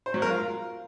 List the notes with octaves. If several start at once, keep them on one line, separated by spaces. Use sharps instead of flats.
C5
F#3
A#4
F4